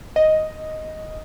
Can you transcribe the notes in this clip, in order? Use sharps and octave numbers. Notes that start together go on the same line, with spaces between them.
D#5